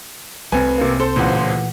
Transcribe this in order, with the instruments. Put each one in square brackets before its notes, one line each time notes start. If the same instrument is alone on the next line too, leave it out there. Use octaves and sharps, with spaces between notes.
[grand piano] F1 G#5 [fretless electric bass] C2 C4 [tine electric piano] B4
[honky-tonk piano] C3 A#3
[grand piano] A4 [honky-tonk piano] C5
[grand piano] D1 C#2 [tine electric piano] A#2 E3 F#5